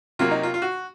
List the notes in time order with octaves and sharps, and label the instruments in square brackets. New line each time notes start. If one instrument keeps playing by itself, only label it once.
[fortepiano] C3 F#3 A#3 F4
D#4
F4
F4
F#4